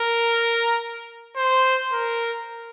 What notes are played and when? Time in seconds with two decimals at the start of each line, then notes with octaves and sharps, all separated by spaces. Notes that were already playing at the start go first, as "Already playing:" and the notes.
Already playing: A#4
1.37 C5
1.92 A#4